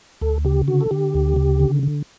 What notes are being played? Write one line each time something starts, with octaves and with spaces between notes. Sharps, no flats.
D2 A4
C#3 G4
D3 F#4
A4
D3 G4
D2
C#3
D3
D3